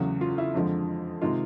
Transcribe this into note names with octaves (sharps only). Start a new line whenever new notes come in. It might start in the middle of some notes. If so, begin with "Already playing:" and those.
Already playing: E2 C#3 F#3 A3 F#4
F4
E4
F2 D3 F3 G#3
C3 D#3 G#3 F4